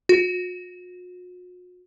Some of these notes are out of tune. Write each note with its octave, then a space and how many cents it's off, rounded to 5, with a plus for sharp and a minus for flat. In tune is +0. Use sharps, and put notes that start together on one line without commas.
F#4 -45